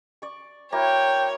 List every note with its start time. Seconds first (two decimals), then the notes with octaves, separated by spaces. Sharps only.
0.22 D5 C#6
0.72 A#3 E4 F#4 C#5 G5